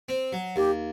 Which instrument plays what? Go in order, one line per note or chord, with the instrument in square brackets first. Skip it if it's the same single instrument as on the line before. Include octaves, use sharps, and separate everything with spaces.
[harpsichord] C4
F#3
[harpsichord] D#2 [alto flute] G4